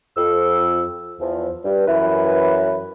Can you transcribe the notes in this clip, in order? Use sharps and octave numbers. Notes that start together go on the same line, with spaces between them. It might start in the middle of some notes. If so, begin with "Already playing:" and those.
F2 E6
E2 F3
G2
F#2 E3 E4 B4